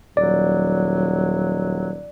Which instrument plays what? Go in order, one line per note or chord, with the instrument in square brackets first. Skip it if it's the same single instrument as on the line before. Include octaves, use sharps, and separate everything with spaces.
[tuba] D#1 [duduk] F#3 [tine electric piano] D5